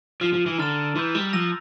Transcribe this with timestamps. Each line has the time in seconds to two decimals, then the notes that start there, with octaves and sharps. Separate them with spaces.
0.21 F3 F6 C7 G7
0.33 F3
0.46 E3
0.58 D3 A#5 F6 A6 E7
0.95 E3 C6 E6 G6
1.15 G3
1.33 F3 E6 A#6 F7